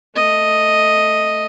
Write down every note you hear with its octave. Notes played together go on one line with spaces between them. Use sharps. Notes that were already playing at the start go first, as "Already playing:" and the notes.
A3 D#5